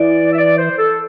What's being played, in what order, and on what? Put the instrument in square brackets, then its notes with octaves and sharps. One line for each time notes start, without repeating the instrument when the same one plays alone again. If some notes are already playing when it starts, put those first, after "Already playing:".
Already playing: [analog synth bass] E3 [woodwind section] D5
[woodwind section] E5
D5
C5
A4